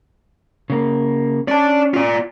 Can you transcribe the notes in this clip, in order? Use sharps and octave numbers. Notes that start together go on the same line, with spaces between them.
C#3 A#3
C#4 D5 A5
F4 D5